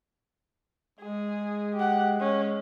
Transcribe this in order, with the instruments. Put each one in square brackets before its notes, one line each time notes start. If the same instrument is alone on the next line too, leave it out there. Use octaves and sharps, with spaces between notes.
[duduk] G#3 [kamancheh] G#4
[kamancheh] G4 F#5
[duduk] G#3 [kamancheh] C#4